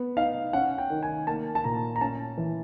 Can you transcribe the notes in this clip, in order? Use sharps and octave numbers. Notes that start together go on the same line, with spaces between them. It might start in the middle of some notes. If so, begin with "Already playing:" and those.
Already playing: B3
D#4 F5
C#4 F#5
G5
D#3
G#5
A#3 A5
A5
A#2 A#5
A#5
C#4 A5
E3